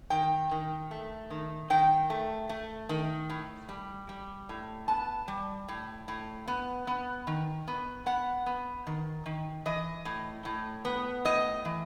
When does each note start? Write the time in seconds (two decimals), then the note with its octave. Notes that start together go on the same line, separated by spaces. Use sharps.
0.10 D#3 G5
0.51 D#3
0.91 A3
1.30 D#3
1.70 D#3 G5
2.10 A3
2.49 A3
2.89 D#3
3.30 A2
3.69 G3
4.09 G3
4.49 A2
4.88 B3 A5
5.28 G3
5.68 A2
6.08 A2
6.48 B3
6.87 B3
7.27 D#3
7.68 B3
8.06 B3 F#5
8.46 B3
8.87 D#3
9.26 D#3
9.66 E3 D#5
10.05 A2
10.45 A2
10.85 B3
11.25 A2 D#5
11.65 E3